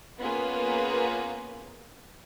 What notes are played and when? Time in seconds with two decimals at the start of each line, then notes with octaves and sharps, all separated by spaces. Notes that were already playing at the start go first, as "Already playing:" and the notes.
0.20 A#3 B3 C#4 F4 G#4 B4